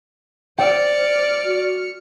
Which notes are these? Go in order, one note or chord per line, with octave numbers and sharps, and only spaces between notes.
C5 D5 G5 F6 C#7
F#4